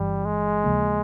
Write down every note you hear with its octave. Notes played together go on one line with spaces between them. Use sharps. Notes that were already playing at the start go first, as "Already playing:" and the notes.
Already playing: G1 G2 E3 G3
G#3
D#2 C#3 F3 A#3